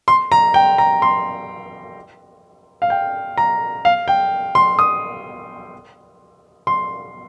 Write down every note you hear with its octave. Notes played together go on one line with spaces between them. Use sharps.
C6
A#5
G5
A#5
C6
F5
G5
A#5
F5
G5
C6
D#6
C6